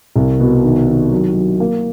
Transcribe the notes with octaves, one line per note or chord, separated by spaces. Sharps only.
C2
B2
D#3
D#3
F#3
F#3
A#3